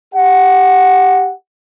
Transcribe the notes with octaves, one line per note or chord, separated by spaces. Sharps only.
G4 F#5